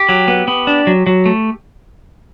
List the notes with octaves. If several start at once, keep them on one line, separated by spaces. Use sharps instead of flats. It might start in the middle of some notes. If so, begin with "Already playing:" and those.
Already playing: G4
F#3
B3
B3
D4
F#3
F#3
A3